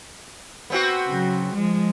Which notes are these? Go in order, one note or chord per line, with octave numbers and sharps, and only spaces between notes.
B3 C4 F#4
C#3 F#3
F3 G#3